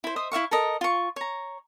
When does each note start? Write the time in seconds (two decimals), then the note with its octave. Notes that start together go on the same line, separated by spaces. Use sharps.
0.04 E4 C5
0.16 C5 D#5 E5 D#6
0.32 E4 E5 F5 C#6
0.51 A4 A#4 D#5
0.81 F4 C#6
1.16 C#5 A#5